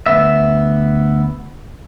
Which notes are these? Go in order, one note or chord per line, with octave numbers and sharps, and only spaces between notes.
D2 D#3 B3 E5